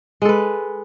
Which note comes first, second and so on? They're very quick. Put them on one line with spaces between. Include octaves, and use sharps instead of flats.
G#3 A4 B4